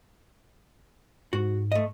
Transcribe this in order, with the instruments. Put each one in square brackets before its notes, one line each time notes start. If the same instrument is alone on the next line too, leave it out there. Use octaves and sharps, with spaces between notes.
[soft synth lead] G#2 [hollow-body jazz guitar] F#4
[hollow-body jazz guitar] A3 D#5